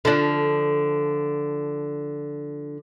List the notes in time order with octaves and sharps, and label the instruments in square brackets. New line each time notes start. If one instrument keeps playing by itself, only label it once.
[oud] D3 F3 D4